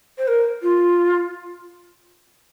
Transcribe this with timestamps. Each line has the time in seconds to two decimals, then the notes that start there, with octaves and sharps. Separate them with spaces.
0.18 C5
0.28 A#4
0.62 F4